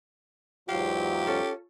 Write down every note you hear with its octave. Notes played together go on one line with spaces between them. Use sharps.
E2 G#2 F#3 F4 G4 F5
C#4 A4